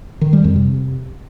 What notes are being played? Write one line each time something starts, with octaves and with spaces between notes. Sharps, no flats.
D#3
G3
F2
C3